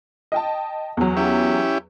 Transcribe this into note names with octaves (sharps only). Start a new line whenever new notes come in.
D#5 G5 A5
E2 F#3
C#4 E4 G4